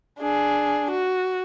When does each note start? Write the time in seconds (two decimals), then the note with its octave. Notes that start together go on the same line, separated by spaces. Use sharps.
0.19 D4 G#4
0.91 F#4